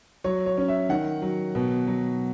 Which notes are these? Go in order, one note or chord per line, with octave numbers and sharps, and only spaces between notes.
F#3 C#5
C#5
C#4
E5
D#3 F#5
F#3
B2
F#3